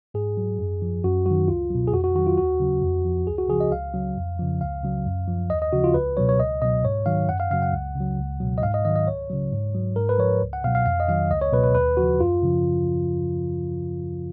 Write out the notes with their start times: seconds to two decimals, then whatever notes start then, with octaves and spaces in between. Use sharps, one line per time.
0.14 G#2 G#4
0.37 F#3
0.59 F#2
0.82 F3
1.04 F#2 F#4
1.26 D#3 F#3 F#4
1.48 C#2 F4
1.70 B2 F#3
1.87 G#4
1.93 F2 F#4
2.04 F#4
2.15 D#3 F#4
2.19 F#3
2.27 F4
2.38 D#2 F#4
2.60 C#3 F#3
2.82 F2
3.05 F3
3.27 C#2 G#4
3.38 F#4
3.49 C#3 F3 G#4
3.60 D#5
3.72 C#2 F5
3.94 C#3 F#3
4.17 F2
4.39 C#3 F3
4.61 C#2 F5
4.83 C#3 F#3
5.06 F#2
5.28 F3
5.50 D#2 D#5
5.62 D#5
5.72 C#3 F3 F#4
5.84 F4
5.94 C#2 B4
6.17 B2 F#3 C#5
6.29 C#5
6.40 C#2 D#5
6.62 B2 F#3 D#5
6.84 G#2 C#5
7.06 D#3 F#3 F5
7.29 F#2 F#5
7.40 F5
7.51 C#3 F#3 F5
7.62 F#5
7.73 C#2
7.95 C#3
8.00 F#3
8.18 C#2
8.40 B2 F#3
8.58 D#5
8.62 G#2 F5
8.74 D#5
8.85 D#3 D#5
8.89 F#3
8.96 D#5
9.07 C#2 C#5
9.30 C#3 F#3
9.52 G#2
9.75 F#3
9.96 G#2 A#4
10.09 B4
10.18 F3 C#5
10.42 C#2
10.53 F#5
10.64 B2 F5
10.67 F#3
10.75 F5
10.86 F2 F5
11.00 D#5
11.08 D#3 F#3 F5
11.30 C#2 D#5
11.41 C#5
11.53 B2 F#3 B4
11.64 B4
11.75 D#2 B4
11.97 C#3 F3 F#4
12.20 F#2 F4
12.42 C#3 F3